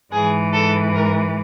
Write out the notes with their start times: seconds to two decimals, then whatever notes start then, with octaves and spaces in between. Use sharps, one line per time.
0.11 G#2 E3 G#4
0.53 A4
0.94 A#4